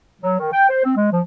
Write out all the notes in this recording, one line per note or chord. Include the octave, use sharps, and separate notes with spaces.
F#3
D#3
G5
C5
C4
G#3
F3